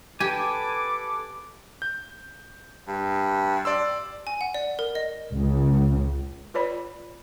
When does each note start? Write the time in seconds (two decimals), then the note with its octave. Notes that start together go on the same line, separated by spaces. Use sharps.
0.20 G4 A4 B4 G#5 D6
1.82 G6
2.88 G2
3.65 D5 C6 E6
4.27 G#5
4.41 F#5
4.54 D5
4.79 A#4
4.95 D#5
5.32 C#2 C#3
6.54 F4 B4 C#5 D5 B5